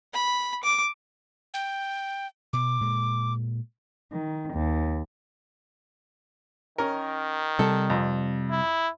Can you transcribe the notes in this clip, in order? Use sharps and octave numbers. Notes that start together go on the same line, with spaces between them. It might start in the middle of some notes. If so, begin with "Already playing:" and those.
B5
D6
G5
B2 D6
A#2 G#3
D#3
D#2
D#3 C#4 A#4
C3 G3 A4
F2
E4